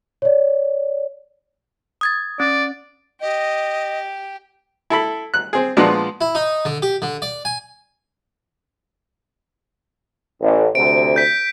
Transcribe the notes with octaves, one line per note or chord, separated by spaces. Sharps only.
C#5 D5
D#6 G#6 A6
C#4 D5
G4 D#5
E4 A4 B5
F#6
C4 G#4
A#2 F3 G#3 B3 D4 F#4
E4
D#4
D3
G4
D3
D5
G#5
A1
D2 C3 D7
G6 B6